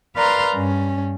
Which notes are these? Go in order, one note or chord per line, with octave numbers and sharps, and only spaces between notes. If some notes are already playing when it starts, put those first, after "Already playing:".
A#4 B4 D5 F5 A#5 C6
G2 C#4